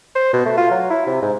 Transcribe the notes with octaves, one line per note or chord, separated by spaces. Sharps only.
C5
B2
A3
F4
F#3
E4
C3
G#2